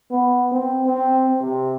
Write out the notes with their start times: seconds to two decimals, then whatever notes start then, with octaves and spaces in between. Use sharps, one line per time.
0.11 B3
0.52 C4
0.85 C4
1.41 C3